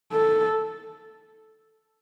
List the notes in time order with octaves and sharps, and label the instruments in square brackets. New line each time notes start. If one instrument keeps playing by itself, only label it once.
[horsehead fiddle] A4